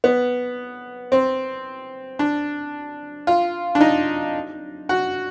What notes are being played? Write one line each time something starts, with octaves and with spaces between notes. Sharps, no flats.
B3
C4
D4
F4
D4
D#4
F#4